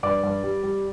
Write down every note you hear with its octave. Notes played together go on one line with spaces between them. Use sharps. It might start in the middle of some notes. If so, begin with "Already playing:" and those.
G2 D5 D6
G2
G3
G3